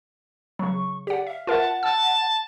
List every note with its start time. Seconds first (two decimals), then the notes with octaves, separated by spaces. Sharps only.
0.59 C#3 F#3 C#6
1.07 G4 D5 F#5
1.27 E5 F5
1.47 F4 A#4 E5 F#5 A5
1.83 A5 E6